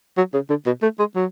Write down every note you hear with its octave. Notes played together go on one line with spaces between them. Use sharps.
F#3
C#3
D3
B2
A3
G#3
F#3